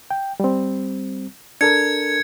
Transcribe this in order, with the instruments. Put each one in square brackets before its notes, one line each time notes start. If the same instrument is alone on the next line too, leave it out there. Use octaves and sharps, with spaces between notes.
[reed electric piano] G5
G3 C4
[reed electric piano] D4 A4 A#4 [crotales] G#6 C#7